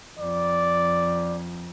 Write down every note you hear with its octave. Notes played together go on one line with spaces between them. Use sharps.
F2 D5